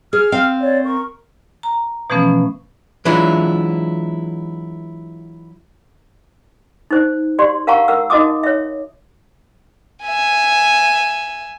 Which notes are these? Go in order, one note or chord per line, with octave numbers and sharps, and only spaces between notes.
G#4 F6
C4 F5
C#5 D5
A#4 C#6
A#5
B2 E3 F3 A3 B3 C#4
E3 F#3 G#3 D4 E4 F4
D#4 C5
F#4 G4 D5 C6
A#4 F5 F#5 A5 A#5 C#6
A#4 F#5 E6
D#4 F#4 D#5 A5 D6 D#6
C#5 E5
E5 G#5